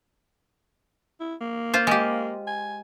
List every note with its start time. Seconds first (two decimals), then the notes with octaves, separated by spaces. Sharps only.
1.20 E4
1.41 A#3
1.74 F4 C5
1.87 G#3 G4
2.47 G#5